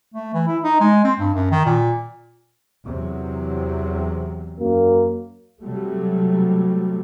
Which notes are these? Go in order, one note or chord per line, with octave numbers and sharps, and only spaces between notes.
A3
E3
E4
D#4
G#3
C4
G2
F#2
D#3
A#2
E2 C3 F#3
F#2 A#3
C3 F#3 G3 A3